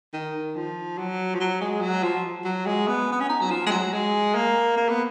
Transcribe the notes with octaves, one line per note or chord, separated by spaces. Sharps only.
D#3
F3
F#3
F3
F#3
G#3
F#3
F3
F#3
G#3
B3
B3
C#4
D#4
F#3
F3
G#3
F#3
G#3
A#3
A#3
B3